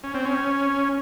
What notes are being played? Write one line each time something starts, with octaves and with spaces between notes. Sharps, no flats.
C#4
C4
C#4